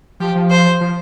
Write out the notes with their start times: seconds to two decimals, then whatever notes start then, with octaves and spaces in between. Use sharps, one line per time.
0.20 F3 G4
0.35 F3
0.50 C5
0.81 F3